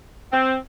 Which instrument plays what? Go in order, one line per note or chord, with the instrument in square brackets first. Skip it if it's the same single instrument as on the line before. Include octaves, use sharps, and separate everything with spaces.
[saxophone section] C4